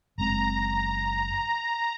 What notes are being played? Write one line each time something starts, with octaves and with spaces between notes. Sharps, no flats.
F#1 G#3 C4 A#5